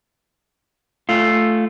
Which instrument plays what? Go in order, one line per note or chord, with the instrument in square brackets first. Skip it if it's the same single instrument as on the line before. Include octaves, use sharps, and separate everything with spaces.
[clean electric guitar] A3 F4